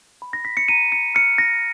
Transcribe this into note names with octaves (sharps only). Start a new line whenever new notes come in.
B5
A#6
B6
C#7
A#5 D#7
C#7
F6 C#7
A#6